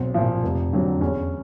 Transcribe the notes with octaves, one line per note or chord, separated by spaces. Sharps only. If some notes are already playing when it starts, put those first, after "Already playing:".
Already playing: B1 C4
A#2 F3
F1
F2 D3 F#3
E2 C#4